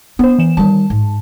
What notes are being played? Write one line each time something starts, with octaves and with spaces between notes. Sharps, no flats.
B3 D4 C5
E3 E7
D#3 G3 A5
G#2